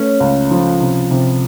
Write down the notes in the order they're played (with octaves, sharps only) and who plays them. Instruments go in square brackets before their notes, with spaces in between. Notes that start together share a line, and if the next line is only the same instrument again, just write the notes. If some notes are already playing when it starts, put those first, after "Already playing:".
Already playing: [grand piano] A3 [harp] B3 C#4
[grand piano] C#2
F3
C3
C3